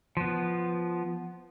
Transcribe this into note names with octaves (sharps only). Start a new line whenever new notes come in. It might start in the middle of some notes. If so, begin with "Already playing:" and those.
F3 B3